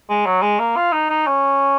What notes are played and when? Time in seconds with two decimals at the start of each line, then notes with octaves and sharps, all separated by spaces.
0.09 G#3
0.26 F#3
0.42 G#3
0.59 A#3
0.76 F4
0.93 D#4
1.10 D#4
1.27 C#4